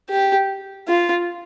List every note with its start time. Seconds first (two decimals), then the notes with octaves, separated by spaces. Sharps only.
0.10 G4
0.88 F4